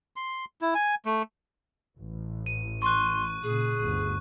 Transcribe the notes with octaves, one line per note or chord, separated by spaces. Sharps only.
C6
E4
G#5
A3
A1
D#7
C6 C#6 F#6
A#2 C#3 G#4
G1 D2